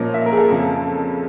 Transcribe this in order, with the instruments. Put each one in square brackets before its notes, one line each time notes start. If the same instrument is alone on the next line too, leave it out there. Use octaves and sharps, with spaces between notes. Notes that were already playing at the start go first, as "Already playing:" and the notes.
Already playing: [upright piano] A#2 F3 A#3 C#4 D#5
E5
A#4
G#4
A4
F2 C#3 F3